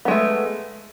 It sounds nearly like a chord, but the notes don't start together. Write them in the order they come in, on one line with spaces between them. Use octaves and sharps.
B3 G#3 A3